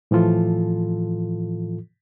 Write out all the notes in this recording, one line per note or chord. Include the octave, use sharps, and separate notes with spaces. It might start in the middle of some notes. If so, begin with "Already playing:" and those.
A2 E3 F3 F4 A4